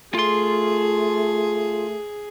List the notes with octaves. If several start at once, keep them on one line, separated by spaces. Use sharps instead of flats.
A3 F4 G#4 C6